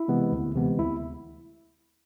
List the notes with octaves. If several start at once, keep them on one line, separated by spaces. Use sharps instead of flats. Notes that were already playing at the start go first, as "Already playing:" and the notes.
Already playing: E4
C3 E3 G#3 B3
D2
C3 E3 G#3 B3
D2 E4